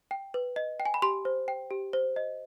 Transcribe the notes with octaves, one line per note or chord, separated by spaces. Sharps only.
G5
B4
D#5
G5
G#5
B5
G4 C6
C5
G5
G4
C5
D#5